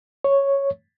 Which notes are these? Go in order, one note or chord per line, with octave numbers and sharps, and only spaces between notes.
C#5